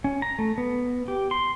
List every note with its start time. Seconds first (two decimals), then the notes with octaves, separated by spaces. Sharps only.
0.04 C#4
0.22 A#5
0.39 A3
0.58 B3
1.08 G4
1.31 C6